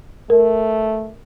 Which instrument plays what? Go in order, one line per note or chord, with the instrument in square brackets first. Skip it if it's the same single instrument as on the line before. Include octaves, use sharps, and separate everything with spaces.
[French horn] A3 [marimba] A#4